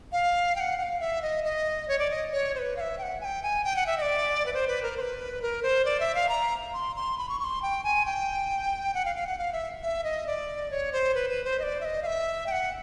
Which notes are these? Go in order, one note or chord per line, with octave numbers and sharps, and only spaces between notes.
F5
G5
F#5
F#5
F5
E5
D#5
D#5
C#5
D5
D#5
C#5
C5
B4
F5
E5
G5
F#5
G#5
G5
G#5
G5
F#5
E5
D#5
D5
B4
C5
B4
A#4
C5
B4
A#4
C5
D5
E5
F5
A#5
C6
C6
B5
C#6
C#6
C6
G5
G#5
G5
F#5
F5
F5
F#5
F5
E5
E5
D#5
D5
C#5
C5
B4
B4
C5
D#5
D5
E5
D#5
F5
E5
G5
F#5